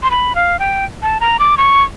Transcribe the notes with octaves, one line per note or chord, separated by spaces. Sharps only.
C6
B5
F5
G5
A5
A#5
D6
C#6